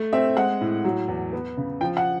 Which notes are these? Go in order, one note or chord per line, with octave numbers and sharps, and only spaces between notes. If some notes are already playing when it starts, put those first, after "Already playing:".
Already playing: A3
C4 E5
G#3 F#5
A2
F#3
E2
B3
C#3
F3 G5
F#5